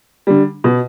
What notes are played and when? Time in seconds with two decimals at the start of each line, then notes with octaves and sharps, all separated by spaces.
0.27 D3 G3
0.64 B2